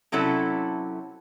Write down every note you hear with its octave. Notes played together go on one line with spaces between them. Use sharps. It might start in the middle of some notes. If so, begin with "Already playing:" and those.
C3 F#3 C#4 E4 A4